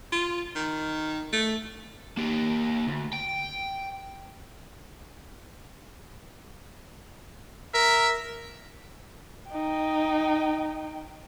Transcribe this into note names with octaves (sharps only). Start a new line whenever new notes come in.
F4
D#3
A3
A#3 G4
D2
G5
A#4 E5
D#4 G5